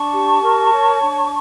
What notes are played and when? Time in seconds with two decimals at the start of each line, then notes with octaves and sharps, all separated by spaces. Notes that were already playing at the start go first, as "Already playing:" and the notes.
Already playing: D4 A5 C#6
0.12 G4
0.42 A#4
0.72 C#5
1.02 D4